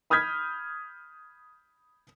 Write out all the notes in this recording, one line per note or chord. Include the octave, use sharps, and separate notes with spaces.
B5 D#6 F6 G6 G#6 B6